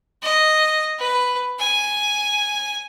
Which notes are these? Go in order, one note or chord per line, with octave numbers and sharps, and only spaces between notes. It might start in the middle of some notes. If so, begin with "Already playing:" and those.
D#5
B4
G#5